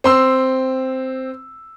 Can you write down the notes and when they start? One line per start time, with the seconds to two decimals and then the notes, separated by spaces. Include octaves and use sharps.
0.04 C4 C6 E6